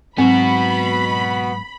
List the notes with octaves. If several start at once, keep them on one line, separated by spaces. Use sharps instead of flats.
G#2 F#3 B3 C4 F#4 B5